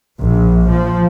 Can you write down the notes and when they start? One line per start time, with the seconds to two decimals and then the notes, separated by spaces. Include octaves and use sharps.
0.20 A#1
0.69 F3